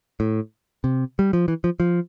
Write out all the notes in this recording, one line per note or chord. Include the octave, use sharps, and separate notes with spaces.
A2
C3
G3
F3
E3
F3
F3